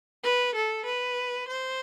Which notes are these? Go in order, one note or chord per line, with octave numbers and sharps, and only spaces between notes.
B4
A4
B4
C5